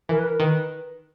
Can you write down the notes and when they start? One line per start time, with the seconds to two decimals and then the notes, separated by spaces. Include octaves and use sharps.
0.09 E3 A#4
0.18 B4
0.26 A#4
0.39 D#3 B4